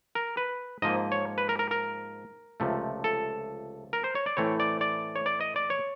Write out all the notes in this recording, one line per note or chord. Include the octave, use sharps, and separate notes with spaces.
A#4
B4
G#2 F3 A#3 D#5
C#5
B4
A#4
A#4
A#4
C#2 C3 F3 A3
A4
A#4
C5
C#5
D5
A2 E3 A3 C4 C#5
D5
D5
C#5
D5
D#5
D5
C#5